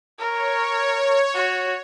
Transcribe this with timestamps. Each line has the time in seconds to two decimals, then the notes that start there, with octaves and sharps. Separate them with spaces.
0.19 A#4 C#5
1.35 F#4